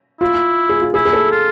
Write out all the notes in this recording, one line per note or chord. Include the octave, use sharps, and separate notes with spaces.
E4 F4
G#4
F4
E4 G#4
G#4
A4
F4